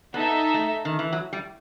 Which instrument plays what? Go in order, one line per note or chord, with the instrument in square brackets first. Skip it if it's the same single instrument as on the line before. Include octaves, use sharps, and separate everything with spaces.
[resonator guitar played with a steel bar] B3 [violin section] D#4 A4 E5
[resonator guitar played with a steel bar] A3
D#3
E3
F#3
G3